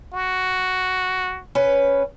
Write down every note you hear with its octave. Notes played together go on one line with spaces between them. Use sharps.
F#4
C#4 B4